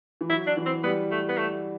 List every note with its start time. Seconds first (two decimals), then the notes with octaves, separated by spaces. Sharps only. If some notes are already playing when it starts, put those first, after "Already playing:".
0.21 E3
0.29 F#3 E4
0.47 D4
0.57 E3
0.66 C4
0.84 G3 B3
1.11 A3
1.29 B3
1.38 A3